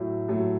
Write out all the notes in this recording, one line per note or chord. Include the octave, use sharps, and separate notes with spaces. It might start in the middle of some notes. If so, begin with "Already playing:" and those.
Already playing: A2 F#3 A3
A2 F#3 A3